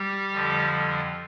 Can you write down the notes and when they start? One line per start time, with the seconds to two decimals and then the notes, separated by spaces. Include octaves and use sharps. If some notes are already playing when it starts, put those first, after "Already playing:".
Already playing: G3 G4
0.31 F2 D3 F3